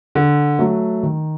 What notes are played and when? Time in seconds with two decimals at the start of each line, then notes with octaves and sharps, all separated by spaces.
0.15 D3
0.59 F#3 A3
1.03 D#3